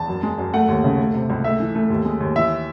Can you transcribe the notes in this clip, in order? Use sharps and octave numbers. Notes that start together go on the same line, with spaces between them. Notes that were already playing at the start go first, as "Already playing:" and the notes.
Already playing: E2 A5
F#2
G#3
F#2
A3 F#5
D#2
C#3
A3
C3
C#2
A3 E5
E3
A3
D#2
G#3
D#2
E3 E5